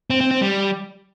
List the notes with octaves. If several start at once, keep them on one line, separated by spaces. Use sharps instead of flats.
C4
C4
C4
G3